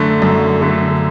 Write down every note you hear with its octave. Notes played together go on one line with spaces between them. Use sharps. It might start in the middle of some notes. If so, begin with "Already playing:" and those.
Already playing: F#2 D3 A3
F#2
D3 A3